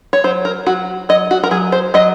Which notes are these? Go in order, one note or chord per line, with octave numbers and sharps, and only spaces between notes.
C#5
F#3 C5
A#4
F#3 F#4
F#3 D#5
F#4
A#4
F#3 G#4
C5
F#3 D#5